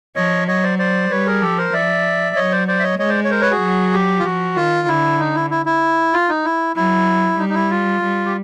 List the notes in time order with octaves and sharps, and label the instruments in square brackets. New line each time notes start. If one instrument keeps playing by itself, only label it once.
[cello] F3 [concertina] C#5 D#5
[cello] F#3 [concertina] C#5 D#5
[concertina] C5 D5
C5 D5
[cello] G3 [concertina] B4 C#5
[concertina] G#4 A#4
[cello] F3 [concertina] G4 A4
[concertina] A#4 C5
[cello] F3 [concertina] D5 E5
[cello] F#3 [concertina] C#5 D#5
[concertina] C5 D5
C5 D5
E5
C#5 D#5
[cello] G#3 [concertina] C#5 D#5
[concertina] C5 D5
C#5
A#4 C5
B4 C#5
F#4 G#4
[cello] F#3
[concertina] G4
F4
[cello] F3 [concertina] F#4
[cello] D#3 [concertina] F4
[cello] D3 [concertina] E4
[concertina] D#4
E4
E4
E4
F4
D#4
E4
[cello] F#3 [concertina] E4
[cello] G3 [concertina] D#4
[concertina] D#4
E4
F4
[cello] G3
[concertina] G4